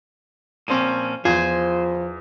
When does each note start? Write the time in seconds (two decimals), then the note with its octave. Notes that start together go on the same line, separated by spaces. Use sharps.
0.68 A#2 F3 C4 C#4 D#7
1.25 E2 F3 F4 C5 G#5